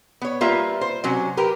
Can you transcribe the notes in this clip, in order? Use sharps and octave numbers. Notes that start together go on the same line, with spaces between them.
B3 C#5
G3 A#3 F4 B4 E5
C5
C3 F#3 C#4
G4 A#4 B4